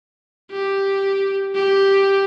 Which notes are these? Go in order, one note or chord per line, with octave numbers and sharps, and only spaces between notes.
G4
G4